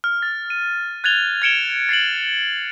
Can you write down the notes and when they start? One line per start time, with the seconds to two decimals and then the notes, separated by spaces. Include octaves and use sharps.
0.04 F6
0.22 A6
0.50 D#7
1.04 F#6 G#6 A6 F7 G7
1.42 G#6 A6 C#7 D7 E7 G7
1.89 A6 C7 D7 F#7